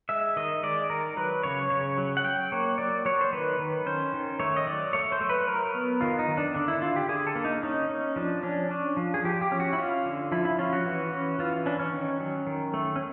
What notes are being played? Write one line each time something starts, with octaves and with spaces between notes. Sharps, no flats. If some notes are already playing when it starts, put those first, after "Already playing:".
G#3 E5
D#3 D#5
G#3 D5
D#3 A#4
F#3 B4
C#3 C#5
C#3 C#5
F#3
F#5
F#3 G5
A#3 C#5
F#3 D5
F#3 C#5
C5
D#3 B4
D#3
C#4 C5
D#3
A3 C#5
D#5
F#3 D5
A3 C#5
C5
A3
B4
F#3 A#4
B3
D#3 F4
D#4
D#3
D4
D3 D4
E4
D3 F4
G4
D3 G#4
A4
A#3
D#4
C#4 D#4
C#4
F3 D4
C#4 D4
C#4 D4
F3
G#4
F3 G4
G4
C#4
F#4
E4
C#4 F4
D3
F3 E4
E4
C#4 F4
F#4
E3 F#4
C#4
E3 F4
C#4 D4
C#4
D#3
F#3
D#3
A3
C#4